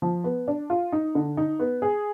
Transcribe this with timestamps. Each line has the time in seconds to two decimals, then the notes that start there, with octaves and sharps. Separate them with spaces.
0.02 F3
0.24 B3
0.48 D4
0.70 F4
0.92 D#4
1.15 D3
1.37 D#4
1.60 B3
1.82 G#4